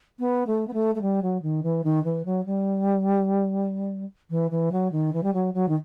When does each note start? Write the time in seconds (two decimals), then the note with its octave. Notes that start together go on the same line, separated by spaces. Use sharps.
0.19 B3
0.47 A3
0.67 B3
0.73 A3
0.95 A3
1.02 G3
1.22 F#3
1.42 D#3
1.63 E3
1.84 D#3
2.04 E3
2.25 F#3
2.46 G3
4.30 E3
4.51 E3
4.72 F#3
4.92 D#3
5.13 E3
5.23 G3
5.33 F#3
5.54 F#3
5.69 D#3